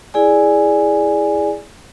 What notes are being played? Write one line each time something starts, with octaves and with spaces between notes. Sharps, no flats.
E4 G#4 D5 G#5